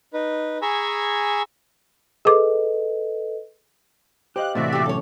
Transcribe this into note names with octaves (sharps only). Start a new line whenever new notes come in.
D#4 B4
G#4 G#5 A#5 B5 C#6 E6
G#4 A4 B4 D#5 D6
G4 C5 D#5 F5 F#6
A2 C3 E3 F#4 D5 E5
A#2 G4
F#3 A3 C#4 A4 C#5